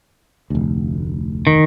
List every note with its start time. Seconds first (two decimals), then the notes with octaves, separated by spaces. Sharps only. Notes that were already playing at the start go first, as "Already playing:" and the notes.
0.50 F1 D2
1.47 D#3